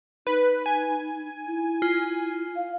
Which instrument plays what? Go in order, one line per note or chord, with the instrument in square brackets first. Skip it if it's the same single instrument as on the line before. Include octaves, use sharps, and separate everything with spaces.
[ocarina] D#4 [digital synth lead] B4
[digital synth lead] G#5
[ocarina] E4
[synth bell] F4
[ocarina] F5